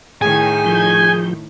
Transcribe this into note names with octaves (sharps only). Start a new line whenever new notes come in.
A2 D#3 G#4 G5 G#5
F3 G6